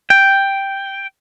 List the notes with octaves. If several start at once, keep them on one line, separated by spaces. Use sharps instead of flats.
G5